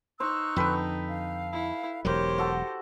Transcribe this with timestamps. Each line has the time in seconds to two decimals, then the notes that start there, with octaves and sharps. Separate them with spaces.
0.20 D#4 C5 C#6 E6 F#6
0.56 F2 D3 A4 B4 G5
1.07 F5
1.53 E4
2.05 E1 F#3 G4 A#4 C5 C#5
2.38 F#4 A4